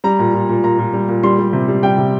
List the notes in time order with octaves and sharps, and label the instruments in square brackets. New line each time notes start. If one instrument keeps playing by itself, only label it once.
[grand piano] G3 A#5
A#2
A#2
A#2
A#2 A#5
A#2
G3
A#2
G3 C6
G3
C3
G3
G3 G5
C3